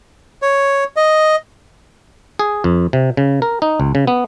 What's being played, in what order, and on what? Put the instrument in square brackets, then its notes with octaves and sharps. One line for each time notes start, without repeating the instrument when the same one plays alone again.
[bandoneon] C#5
D#5
[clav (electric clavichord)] G#4
F2
C3
C#3
A#4
D#4
C#2
C#3
B3